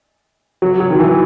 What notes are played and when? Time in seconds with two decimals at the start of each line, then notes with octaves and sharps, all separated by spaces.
0.62 F#3
0.80 F#3
0.90 D#3
0.99 E3